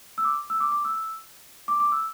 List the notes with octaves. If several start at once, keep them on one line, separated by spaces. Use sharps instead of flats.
E6
D6
E6
D6
D6
E6
D6
D6
E6